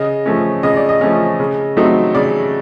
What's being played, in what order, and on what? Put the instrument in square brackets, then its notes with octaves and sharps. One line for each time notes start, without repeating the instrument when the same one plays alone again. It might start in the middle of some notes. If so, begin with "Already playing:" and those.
Already playing: [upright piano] C#3 D#5
F3 A3 C#4
C#3 D#5
D5
D#5
F3 A3 C#4
C#3
F#3 A3 C4 D#4
C#3 D5